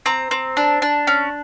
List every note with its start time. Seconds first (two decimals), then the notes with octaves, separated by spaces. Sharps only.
0.06 C4 A#5
0.31 C4
0.57 D4
0.82 D4
1.07 C#4